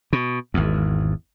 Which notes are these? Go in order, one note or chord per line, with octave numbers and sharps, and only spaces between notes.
B2
G#1 E2